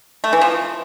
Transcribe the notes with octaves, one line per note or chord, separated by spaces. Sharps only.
A3
E3
F3